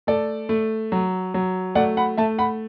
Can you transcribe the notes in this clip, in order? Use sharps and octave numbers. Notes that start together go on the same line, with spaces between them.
A3 A4 D5
A3
F#3
F#3
A3 D5 F#5
F#5 B5
A3 E5 A5
F#5 B5